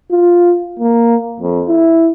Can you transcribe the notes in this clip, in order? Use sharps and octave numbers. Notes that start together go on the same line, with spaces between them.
F4
A#3
F2
E4